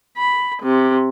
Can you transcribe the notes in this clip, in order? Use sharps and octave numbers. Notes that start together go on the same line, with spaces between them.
B5
C3